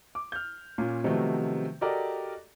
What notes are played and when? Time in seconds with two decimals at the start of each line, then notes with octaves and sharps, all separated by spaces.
0.15 D6
0.32 F6 G6
0.78 A#2 A#3 C#4 F4
1.04 C3 D#3 F3 F#3 A3 B3
1.81 F#4 G4 A4 A#4 D5 D#5